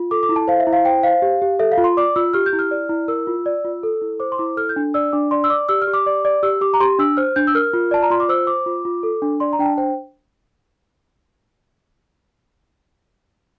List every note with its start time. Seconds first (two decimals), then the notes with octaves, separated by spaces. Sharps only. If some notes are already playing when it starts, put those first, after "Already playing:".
Already playing: F4
0.11 A4 D6
0.23 D6
0.29 E4
0.36 A5
0.48 C5 F5
0.60 E5
0.67 E4
0.73 F5
0.85 C5 G5
1.03 C5 F5
1.22 G4
1.42 G4
1.59 A4 E5
1.72 F5
1.78 F4
1.84 C6
1.97 D5 D6
2.16 F4 E6
2.34 G4 F6
2.46 G6
2.53 E4
2.59 F6
2.71 D5
2.89 E4
3.08 A#4 E6
3.27 F4
3.46 D5
3.65 F4
3.83 A4
4.02 E4
4.20 C5 D6
4.32 C6
4.38 E4 D6
4.57 A4 F6
4.69 G6
4.76 D4
4.94 D5 E6
5.13 D4 D6
5.31 D5 C6
5.44 E6
5.50 D5 D6
5.69 G4 E6
5.82 F6
5.87 G4
5.93 D6
6.06 D5
6.25 D5
6.43 G4 E6
6.61 G4 D6
6.74 A#5
6.80 G4 C6
6.99 D4 E6
7.17 C5 F6
7.36 D4 G6
7.47 E6
7.55 A#4 F6
7.73 F4
7.91 D5 A5
8.03 A#5
8.10 F4 C6
8.20 D6
8.29 C5 E6
8.47 C5 D6
8.66 F4
8.85 F4
9.03 A4
9.22 D4
9.40 D5 C6
9.53 A#5
9.59 D4 G5
9.65 A5
9.78 C5 G5